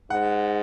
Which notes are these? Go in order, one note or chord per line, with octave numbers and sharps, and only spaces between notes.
G#2 F#5